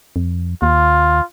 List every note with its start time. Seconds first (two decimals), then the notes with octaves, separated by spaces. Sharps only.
0.16 F2
0.62 D#2 F4